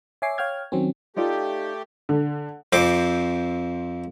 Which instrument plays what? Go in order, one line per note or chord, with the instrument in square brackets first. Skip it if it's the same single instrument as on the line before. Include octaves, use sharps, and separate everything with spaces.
[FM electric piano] C#5 E5 G#5 D6 C7
C#5 F5 G5 F6 G#6
D#3 F#3 C4 C#4
[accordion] A3 G4 [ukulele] D#4 F4 D5
[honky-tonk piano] D3
[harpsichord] F2 C4 D6